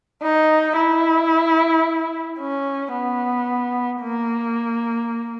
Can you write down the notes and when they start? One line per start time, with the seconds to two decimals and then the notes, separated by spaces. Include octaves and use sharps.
0.23 D#4
0.76 E4
2.40 C#4
2.94 B3
4.02 A#3